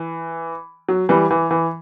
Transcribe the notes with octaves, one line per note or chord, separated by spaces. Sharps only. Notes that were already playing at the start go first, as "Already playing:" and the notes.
Already playing: E3
F#3
E3 G3
E3
E3